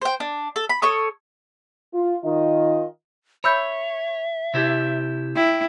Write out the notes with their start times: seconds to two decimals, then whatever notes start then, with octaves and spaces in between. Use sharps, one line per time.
0.02 C5 G5
0.20 D4
0.56 A4
0.69 B5
0.82 A4 C#5 C#6 D#6
1.94 F4
2.25 D#3 F4 D#5
3.44 C#5 E5 B5 E6 G6
4.54 C3 E4 G4
5.36 E4 G5